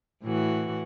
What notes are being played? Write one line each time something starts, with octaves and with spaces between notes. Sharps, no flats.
A2 E3 F#4